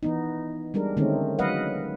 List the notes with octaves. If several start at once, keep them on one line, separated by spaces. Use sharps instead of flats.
E3 B3 D#4
G3 G#3 D4 A#4
D3 D#3 G#3 A3 C4 C#4
F#3 G#3 B4 D#5 F5 F#5